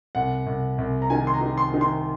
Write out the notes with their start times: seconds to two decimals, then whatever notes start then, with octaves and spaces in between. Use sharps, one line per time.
0.15 C2 F#5
0.46 C2
0.78 C2
1.02 A#5
1.10 D#3 G#5
1.27 C6
1.34 A#5
1.41 D#3
1.58 C6
1.74 D#3
1.81 C6